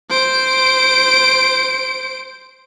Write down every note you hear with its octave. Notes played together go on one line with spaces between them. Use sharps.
C5 D7